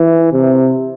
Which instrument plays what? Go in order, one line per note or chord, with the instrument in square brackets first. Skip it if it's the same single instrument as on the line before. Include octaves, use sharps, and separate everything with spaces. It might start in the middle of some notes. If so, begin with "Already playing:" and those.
Already playing: [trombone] E3
C3